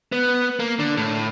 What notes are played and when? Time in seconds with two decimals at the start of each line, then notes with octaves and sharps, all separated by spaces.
0.12 B3
0.60 A#3
0.79 D3
0.97 A2